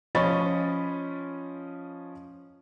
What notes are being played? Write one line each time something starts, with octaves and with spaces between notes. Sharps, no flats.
F3 C#4 D#5 B5 C#6 A6